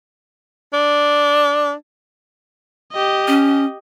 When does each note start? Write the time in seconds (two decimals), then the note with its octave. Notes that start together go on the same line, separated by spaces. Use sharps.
0.73 D4
2.93 G4 D#5
3.28 C#4